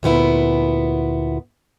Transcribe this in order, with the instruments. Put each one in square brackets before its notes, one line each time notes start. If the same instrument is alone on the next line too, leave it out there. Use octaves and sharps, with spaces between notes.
[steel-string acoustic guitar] D2 A#2 B3 E4